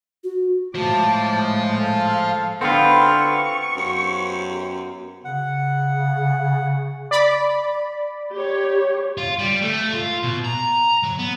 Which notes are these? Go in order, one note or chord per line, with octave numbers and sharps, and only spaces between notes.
F#4
A2 F3 G#3 A5 D6
A4 F5
D3 B3 C4 F4 B4 C#6
F#2
C#3 F#5
D5 B5
G4 C#5
F4
G3
A3
F4
B2
A#5
F#3
B3